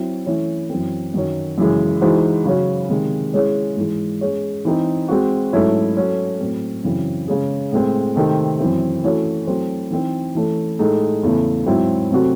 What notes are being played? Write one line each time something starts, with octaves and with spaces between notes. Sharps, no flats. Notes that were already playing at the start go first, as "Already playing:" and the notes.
Already playing: F#3 C4 E4
E3 A3 C#4 E4
F#2 E3 C4
F#2 D#3 F#3 C#4
F#2 C#3 E3 G#3
E3 G#3 D#4 F#4 C5
C#3 F#3 C#4 F#4
C3 D#3 G#3
G#3 C#4 E4 G#4 C#5
G#2 E3 G#3
G#3 C#4 G#4 C#5
E3 C4 D#4
G#3 C4 F#4
G#2 F#3 A3 C#4 E4
F#3 C#4 F#4 A4
A2 F#3 C4
F#2 C#3 E3 C4
C#3 G#3 C#4 G#4
A2 G#3 C4
C3 D#3 A3 C4
F#2 E3 C4
E3 A3 C#4 F#4 C#5
F#3 A3 C4 E4 C5
E3 C4 D#4
E3 A3 C#4
A2 G#3 D#4 A4
E2 C#3 E3 A3
G#2 F#3 C4 E4
C3 F#3 A3 C4 F#4